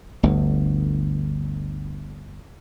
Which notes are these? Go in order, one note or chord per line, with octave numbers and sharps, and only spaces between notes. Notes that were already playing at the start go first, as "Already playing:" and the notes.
G1 D2